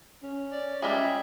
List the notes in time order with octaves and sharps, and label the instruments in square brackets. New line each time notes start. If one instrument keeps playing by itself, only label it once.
[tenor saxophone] C#4
[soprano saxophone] D5
[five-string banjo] G3 G#3 G#4 [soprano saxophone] E5